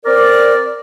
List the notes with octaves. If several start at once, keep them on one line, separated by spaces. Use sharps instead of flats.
C4 A#4 D5